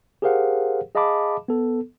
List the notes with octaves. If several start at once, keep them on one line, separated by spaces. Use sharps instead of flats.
G4 G#4 A#4 C5 F5 F#5
G#4 D#5 F5 A5 B5 D6
B3 A4